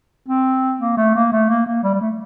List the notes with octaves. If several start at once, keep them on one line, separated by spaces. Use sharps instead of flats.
C4
A#3
A3
A#3
A3
A#3
A#3
G3
G3
A3